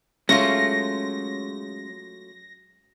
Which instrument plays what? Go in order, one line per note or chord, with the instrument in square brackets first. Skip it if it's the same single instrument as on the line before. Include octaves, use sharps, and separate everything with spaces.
[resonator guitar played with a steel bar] F#3 A3 F4 [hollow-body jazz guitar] G#3 C#4 [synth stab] A#6